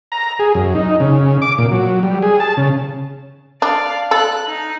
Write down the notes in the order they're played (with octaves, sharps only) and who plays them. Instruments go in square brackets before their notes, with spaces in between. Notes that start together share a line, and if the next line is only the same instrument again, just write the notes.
[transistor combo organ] A#5
G#4
F#2
D#4
C#3
D6
A#2
F#3
G3
G#4
A5
C#3
[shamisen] D4 [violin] D5 F5
[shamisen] A4 [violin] F#6
[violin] D#4